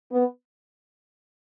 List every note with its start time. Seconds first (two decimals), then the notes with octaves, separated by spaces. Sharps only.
0.11 B3